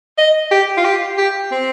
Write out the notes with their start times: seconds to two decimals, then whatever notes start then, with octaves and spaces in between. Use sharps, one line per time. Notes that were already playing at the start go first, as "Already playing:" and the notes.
0.18 D#5
0.51 G4
0.77 F4
0.85 G4
1.18 G4
1.52 C4